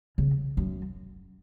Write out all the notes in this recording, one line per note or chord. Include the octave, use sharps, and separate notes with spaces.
C#3
F#2